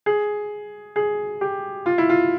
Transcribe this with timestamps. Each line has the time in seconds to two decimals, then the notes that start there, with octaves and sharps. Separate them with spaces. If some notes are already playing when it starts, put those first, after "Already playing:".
0.06 G#4
0.96 G#4
1.41 G4
1.86 F4
1.98 E4
2.09 F4